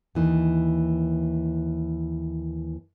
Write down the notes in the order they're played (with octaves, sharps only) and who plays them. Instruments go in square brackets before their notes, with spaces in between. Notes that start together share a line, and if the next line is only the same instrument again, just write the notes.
[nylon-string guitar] D#2 E3 D#4